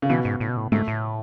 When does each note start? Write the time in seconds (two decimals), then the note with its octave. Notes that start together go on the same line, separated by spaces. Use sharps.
0.02 C#3
0.09 B2 E3
0.25 G#2
0.40 A2
0.49 B2
0.57 A2
0.72 G#2 A3
0.88 A2